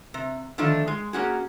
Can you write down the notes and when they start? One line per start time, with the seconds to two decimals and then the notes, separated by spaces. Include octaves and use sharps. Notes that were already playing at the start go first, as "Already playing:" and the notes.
0.14 C3
0.58 D3 D#3 F3 A3 D4 A4
0.87 G#3
1.13 A#3 C#4 F#4 G#4